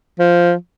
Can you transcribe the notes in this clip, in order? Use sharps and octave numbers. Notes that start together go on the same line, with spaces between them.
F3